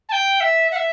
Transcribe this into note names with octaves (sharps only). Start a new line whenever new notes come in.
A5
G5
E5
F#5
E5